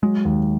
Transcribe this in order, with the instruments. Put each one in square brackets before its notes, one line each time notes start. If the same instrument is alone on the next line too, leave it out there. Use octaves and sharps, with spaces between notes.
[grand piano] F#3 [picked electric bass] G#3
[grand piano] D#2